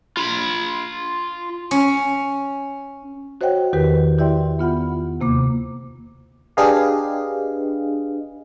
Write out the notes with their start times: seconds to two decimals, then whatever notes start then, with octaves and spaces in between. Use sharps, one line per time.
0.17 F4 B5
1.71 C#4
3.41 F#4 C5 C#5 D#5 F#5 G5
3.73 E2 D#3 G4 A#4 B4
4.18 E4 G4 D5 E5 G5 C6
4.59 B3 F4 F#5 B5
5.20 D#2 C3 A#3 D6
6.57 D4 G4 G#4 B4 D#5 F5